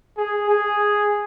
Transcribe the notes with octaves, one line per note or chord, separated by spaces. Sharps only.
G#4
G#4